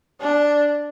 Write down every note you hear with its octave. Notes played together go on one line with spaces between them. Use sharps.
D4